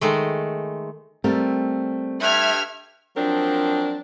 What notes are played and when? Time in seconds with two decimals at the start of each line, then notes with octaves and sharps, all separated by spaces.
0.01 D#3 G#3 A3
1.24 G3 A3 C4 A#4
2.22 G2 E5 F6 G#6
3.16 F3 F#3 C4 D4 A#4